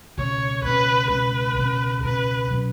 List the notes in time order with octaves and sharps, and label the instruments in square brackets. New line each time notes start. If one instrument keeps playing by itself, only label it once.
[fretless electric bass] C#2 B2 G#3 C#4 [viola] C#5
[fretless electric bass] C#2 B2 G#3 C#4 [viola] B4
[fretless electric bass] C#2 B2 G#3 C#4 [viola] B4
[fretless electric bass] C#2 B2 G#3 C#4
[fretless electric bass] C#2 B2 F#3 C#4 [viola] B4
[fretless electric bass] B2 F#3 C#4